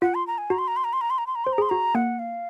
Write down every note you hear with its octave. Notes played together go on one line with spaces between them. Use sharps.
F4 F#5
C6
A#5
G#5
F#4 A#5
C6
A#5
C6
A#5
C6
A#5
C6
A#5
C6
A#5
C5 C6
A#5
G#4
C6
F#4 A#5
A#3 F#5
F5